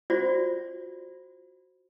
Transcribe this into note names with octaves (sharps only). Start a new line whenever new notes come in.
F4 F#4 C5 D5